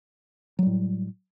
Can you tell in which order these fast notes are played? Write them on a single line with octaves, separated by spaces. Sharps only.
F#3 G3 A2